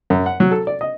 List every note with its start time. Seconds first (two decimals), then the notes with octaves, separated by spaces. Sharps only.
0.10 F#2
0.26 F#5
0.40 F#3
0.51 A4
0.67 D5
0.81 D#5